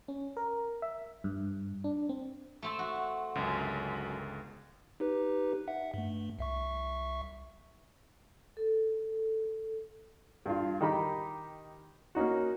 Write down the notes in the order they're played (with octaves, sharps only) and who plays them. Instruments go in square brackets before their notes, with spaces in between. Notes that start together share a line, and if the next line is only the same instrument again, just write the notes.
[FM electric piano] C#4
A#4
E5
G2
D4
C4
[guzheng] A3 C4 A5
F#4
[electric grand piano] G1 C#2 [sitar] F#2
[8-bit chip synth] D#4 G4 B4
E5 F#5
G2 A3
C2 E5 C#6
[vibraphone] A4
[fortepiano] G2 F4
D#3 D#4 G4 B5
A#3 C#4 D#4 F#4